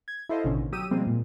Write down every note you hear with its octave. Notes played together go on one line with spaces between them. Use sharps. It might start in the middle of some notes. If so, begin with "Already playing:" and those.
G#6
E4 A4 C5 D#5 F5
A1 B2 D3 D#3 C#4
F#3 G4 D#6 E6 D#7
B2 F3 G3 G#3 A#3 C4
A#2